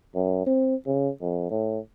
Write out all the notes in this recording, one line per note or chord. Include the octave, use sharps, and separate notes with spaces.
F#2
C4
C#3
F2
A2